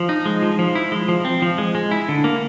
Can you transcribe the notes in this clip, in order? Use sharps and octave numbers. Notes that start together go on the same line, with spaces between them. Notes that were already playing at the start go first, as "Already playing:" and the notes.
Already playing: F3
D#4
G#3
F3
F3
E4
G#3
F3
C4
F3
G#3
G#3
E4
D3
A#3